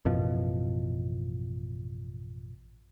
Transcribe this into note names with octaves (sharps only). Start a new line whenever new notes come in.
A1 F#2 B2 F3